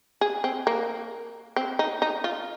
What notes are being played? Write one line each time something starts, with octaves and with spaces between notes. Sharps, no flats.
G#4
C4
A#3
C4
D#4
D#4
F4